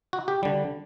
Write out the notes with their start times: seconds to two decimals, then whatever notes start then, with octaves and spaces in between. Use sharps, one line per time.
0.13 F#4
0.28 G4
0.43 D3 G3